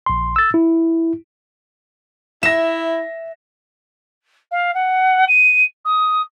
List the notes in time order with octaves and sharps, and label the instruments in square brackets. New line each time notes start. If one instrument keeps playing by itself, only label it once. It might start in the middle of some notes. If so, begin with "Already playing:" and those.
[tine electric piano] A#1 C6
E6 A6
E4
[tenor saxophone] E4 [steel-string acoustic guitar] E5 [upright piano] A#6 E7
[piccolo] F5
F#5
D#7
D#6